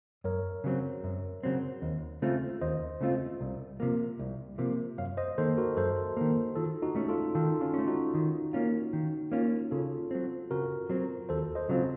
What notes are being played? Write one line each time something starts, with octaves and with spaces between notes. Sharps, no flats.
F#2 A#4 C#5
C#3 F#3 C4
F#2
C#3 F#3 C4
D#2
C#3 A3 C4 F4
D#2 C5 D#5
C#3 A3 C4 F4
C2
C3 F3 A#3
C2
C3 F3 A#3
F#2 C#5 F5
C5 D#5
D#3 A#3 A4 C5
F#4 A#4
F#2 A4 C5
D#3 A#3
D#3 F4 A4
D#4 F#4
A3 C#4
F4 A4
D#3 F4 A4
C#4 F4
A3 C#4
D#4 F#4
D#3
A#3 C#4 F4
D#3
A#3 C#4 F4
C#3 F4 A4
F#3 C4
C#3 F#4 A#4
F#3 C4
D#2 A4 C5
C5 D#5
C#3 F#3 C4 F4